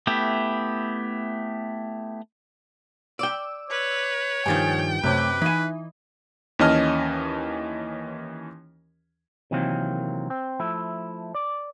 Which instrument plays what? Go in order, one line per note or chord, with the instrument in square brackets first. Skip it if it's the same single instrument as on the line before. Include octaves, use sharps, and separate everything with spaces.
[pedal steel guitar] A3 B3 E4 G4
[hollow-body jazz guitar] D5 G5 [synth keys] D6 E6
[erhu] B4 [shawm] C#5
[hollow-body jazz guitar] G2 D#3 F3 [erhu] G5 [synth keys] G#5 A6
[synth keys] F#2 C3 D6 [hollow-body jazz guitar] A3 C#4 [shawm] B4
[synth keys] E3 D#4 [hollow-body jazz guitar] G#5 B5
[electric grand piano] D#2 E3 C#4 D#5 A5 F6
[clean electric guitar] C3 D#3 E3 F#3 A#3 C4
C4
F3 A3 E4
D5